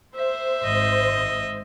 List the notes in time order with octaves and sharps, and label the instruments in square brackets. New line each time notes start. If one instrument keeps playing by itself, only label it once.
[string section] C5 [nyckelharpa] E5
[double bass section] G#1 [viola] D#5